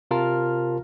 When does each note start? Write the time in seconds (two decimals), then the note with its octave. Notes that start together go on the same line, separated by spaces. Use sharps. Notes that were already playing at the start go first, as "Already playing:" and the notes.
0.11 C3 F4 A#4 A5 F6